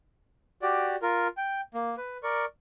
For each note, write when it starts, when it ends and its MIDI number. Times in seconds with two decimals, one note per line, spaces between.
0.62 0.96 66
0.62 0.96 67
0.62 0.96 74
1.02 1.28 65
1.02 1.28 70
1.37 1.61 79
1.74 1.95 58
1.98 2.17 71
2.23 2.45 70
2.23 2.45 74
2.23 2.45 85